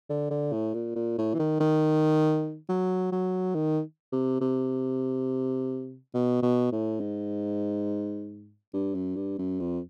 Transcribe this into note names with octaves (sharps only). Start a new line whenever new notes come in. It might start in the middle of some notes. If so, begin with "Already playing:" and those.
D3
D3
A2
A#2
A#2
A2
E3
D#3
D#3
F#3
F#3
D#3
C3
C3
B2
B2
A2
G#2
G2
F#2
G2
F#2
F2